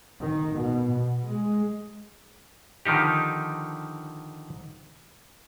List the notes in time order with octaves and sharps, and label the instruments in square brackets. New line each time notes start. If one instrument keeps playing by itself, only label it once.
[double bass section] D#3
B2
B2
G#3
[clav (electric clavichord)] D3 D#3 F3 D#4 G4